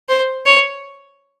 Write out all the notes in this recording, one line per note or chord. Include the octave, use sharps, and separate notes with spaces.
C5
C#5